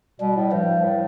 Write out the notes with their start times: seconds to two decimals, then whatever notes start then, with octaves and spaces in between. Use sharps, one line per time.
0.20 B2 G3
0.36 A2
0.52 G2 F3
0.84 A2